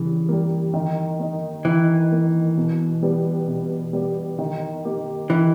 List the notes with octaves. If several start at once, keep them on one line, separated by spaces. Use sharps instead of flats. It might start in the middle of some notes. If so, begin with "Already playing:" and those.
Already playing: C#3 E3 G3
G3 A#3
D#3
A#3 D#4
D#3 E3
A#3 D#4
B2
G3 B3 G4
B2
G3 B3 G4
D#3
A#3 D#4 G4
D#3 E3